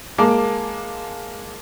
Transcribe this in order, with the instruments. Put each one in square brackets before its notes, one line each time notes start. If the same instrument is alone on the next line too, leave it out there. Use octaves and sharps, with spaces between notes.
[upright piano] G#3 A#3 A5 D6